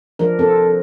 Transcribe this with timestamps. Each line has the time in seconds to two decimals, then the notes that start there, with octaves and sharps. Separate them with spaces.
0.19 F3 D4 A#4
0.39 C4 A4